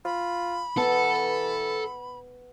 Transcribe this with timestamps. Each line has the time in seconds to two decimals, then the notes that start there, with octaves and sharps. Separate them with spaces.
0.05 F4 B5
0.77 E3 B3 A4 A5